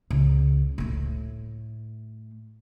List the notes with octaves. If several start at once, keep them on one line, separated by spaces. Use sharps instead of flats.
C#2
A2 A3